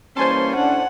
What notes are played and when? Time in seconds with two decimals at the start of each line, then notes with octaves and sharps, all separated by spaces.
0.17 E3 G3 A#3 C#4 C5 G#5 A5 C6
0.56 A2 D4 F#5